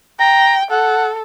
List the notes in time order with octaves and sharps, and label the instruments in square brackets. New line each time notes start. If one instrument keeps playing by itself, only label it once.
[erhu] G5 [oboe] A#5
[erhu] A4 [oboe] F#5